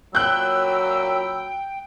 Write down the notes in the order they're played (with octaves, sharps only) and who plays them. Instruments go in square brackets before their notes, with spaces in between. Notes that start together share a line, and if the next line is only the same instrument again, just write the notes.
[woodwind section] F#2 B5 E6 [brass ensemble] A#2 F#3 [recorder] G5 [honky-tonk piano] F#6 G6